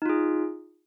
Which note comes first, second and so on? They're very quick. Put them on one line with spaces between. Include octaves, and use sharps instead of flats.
D#4 F4 G#4